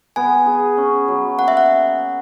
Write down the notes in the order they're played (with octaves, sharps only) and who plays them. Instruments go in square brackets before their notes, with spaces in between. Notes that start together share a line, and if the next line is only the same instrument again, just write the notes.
[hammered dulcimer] B3 [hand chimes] G#5
[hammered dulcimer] G#4
C#4
F#3
[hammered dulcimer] A#3 [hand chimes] F#5
[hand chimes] E5
F#5